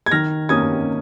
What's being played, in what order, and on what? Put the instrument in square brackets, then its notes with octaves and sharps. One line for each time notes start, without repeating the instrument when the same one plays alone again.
[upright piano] G#6
D#3 F6 A#6
A#3 C#4 D#6 G#6